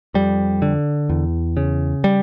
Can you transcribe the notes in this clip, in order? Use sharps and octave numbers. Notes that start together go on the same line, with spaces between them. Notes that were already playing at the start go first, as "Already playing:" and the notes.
F2 G3
D3
E2
C#3
G3